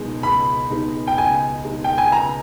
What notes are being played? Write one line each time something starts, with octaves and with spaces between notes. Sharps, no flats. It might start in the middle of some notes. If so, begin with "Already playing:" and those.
Already playing: C#2 B2 G#3 D#4
C#2 B5
B2 G#3 D#4
G5
C#2 G#5
B2 G#3 D#4
G5
G#5
C#2 A#5